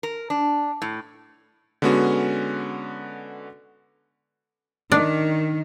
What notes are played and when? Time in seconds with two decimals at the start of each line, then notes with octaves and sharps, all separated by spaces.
0.03 A#4
0.30 D4
0.82 A2
1.82 D3 G#3 B3 C#4 F#4
4.92 D#3 D4